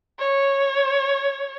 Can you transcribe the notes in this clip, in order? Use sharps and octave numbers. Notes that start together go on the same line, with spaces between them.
C#5